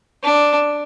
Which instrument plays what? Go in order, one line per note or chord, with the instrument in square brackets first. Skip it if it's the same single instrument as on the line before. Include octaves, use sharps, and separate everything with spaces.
[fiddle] D4